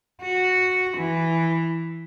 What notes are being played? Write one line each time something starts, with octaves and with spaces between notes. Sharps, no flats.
F#4
E3